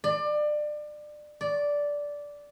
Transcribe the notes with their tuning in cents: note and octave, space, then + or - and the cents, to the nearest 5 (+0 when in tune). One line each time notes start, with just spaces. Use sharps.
D5 +25
D5 -10